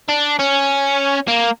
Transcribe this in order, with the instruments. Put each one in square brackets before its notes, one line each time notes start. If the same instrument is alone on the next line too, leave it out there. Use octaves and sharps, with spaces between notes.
[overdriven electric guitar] D4
C#4
A#3